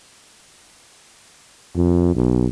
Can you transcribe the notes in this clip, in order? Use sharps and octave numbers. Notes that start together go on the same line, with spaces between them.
F2
B1